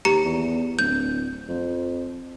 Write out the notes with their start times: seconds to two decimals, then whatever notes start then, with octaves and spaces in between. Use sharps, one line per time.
0.05 D#2 G4 A#5 C#7
0.25 E2
0.79 D1 G6
1.49 F2